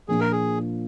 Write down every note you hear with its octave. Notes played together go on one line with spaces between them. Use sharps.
A#2 F3 A#3 D4 G#4
A#4
G#4